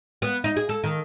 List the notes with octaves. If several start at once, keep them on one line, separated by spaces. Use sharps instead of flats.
B3
D#4
G#4
A4
D#3